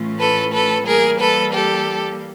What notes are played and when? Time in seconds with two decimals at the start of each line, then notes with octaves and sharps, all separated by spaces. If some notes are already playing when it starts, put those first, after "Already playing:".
Already playing: A2 E3 A3 C#4 F4
0.19 A4 B4
0.53 A4 B4
0.86 E3 G3 A#3 G#4 A#4
1.20 A4 B4
1.53 G4 A4